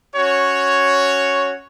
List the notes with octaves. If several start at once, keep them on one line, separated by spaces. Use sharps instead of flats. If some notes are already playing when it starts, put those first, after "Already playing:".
C#4 F#4 C#5